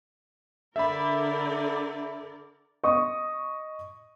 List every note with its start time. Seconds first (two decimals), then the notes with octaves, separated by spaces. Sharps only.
0.76 D3 A#4 D5 E5 B5
2.84 D#5 C#6 D#6